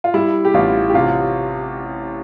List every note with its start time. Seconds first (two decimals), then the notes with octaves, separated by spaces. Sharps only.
0.04 F4
0.14 G3 E4
0.45 G4
0.54 A1 F4
0.89 G4
0.94 C3 F4